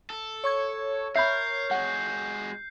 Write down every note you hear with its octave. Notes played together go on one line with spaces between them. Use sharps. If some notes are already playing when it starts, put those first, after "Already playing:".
A4
C#5 C#6 G#6
A#4 E5 B5 G6 C7
G#3 F#4 F#5